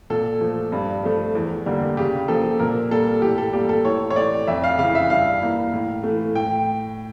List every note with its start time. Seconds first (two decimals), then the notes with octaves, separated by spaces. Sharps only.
0.10 A#2 A4
0.41 F3 A3
0.72 G2
1.03 F3 A3
1.35 E2
1.66 D3 G3 A#3
1.97 C#3 G4
2.28 F3 A#3 A4
2.59 A#2 A#4
2.91 G3 A#3 A4
3.22 A2 G4
3.38 A4
3.53 G3 A#3 G4
3.69 A4
3.85 A2 C#5
4.10 C#5
4.16 E3 A3 D5
4.47 F2 E5
4.64 F5
4.79 C#3 E3 F5
4.95 E5
5.10 G2 F5
5.41 E3 A#3
5.73 A2
6.03 E3 A3
6.35 A2 G5